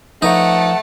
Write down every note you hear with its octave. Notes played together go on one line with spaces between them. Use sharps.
F3 A3 D#4 B4 C#5 F#5 A5